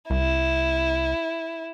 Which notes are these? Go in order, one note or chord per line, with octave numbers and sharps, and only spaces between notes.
C2 E4